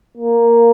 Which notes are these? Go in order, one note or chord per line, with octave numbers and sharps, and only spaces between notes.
A#3